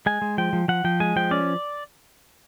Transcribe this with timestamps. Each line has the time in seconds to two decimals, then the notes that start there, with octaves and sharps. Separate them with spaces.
0.06 G#3 G#5
0.22 G#3
0.38 F3 G5
0.53 F3
0.68 F3 F#5
0.84 F3 G5
1.00 G#3 G#5
1.16 F3 G5
1.31 C#4 D5